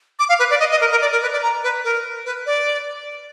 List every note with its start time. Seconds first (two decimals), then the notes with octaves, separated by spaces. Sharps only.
0.19 D6
0.29 F5
0.39 B4
0.50 D5
0.60 D#5
0.71 D#5
0.81 A#4
0.91 A#4
1.02 D5
1.12 A#4
1.22 B4
1.33 D5
1.43 A#5
1.63 B4
1.84 A#4
2.25 B4
2.46 D5